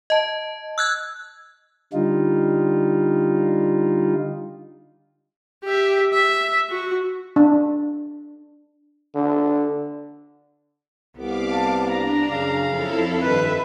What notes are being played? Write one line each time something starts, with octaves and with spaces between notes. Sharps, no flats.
D#5 A5
E6 F#6 G#6
D3 G3 D#4 F4
G4 E5
E5
F#4
D4
D3
C2 B3 F5 D6
A5
D4 A#5
F#2 C#3 F5
F2 E4 A4
G2 D#3 B4 E5